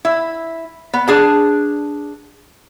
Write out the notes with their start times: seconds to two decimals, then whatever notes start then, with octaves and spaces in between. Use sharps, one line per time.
0.05 E4
0.93 B3
1.08 D4 G#4 A5